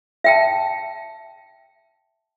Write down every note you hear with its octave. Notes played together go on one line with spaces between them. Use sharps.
E5 G5 A5